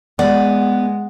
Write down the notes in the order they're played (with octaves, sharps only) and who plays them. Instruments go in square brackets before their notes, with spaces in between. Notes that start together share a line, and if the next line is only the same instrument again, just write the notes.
[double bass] G#3 [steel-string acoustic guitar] B3 [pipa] D5 [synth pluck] F#5